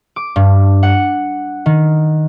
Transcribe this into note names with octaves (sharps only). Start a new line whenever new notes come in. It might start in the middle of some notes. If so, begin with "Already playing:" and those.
D6
G2
F#5
D#3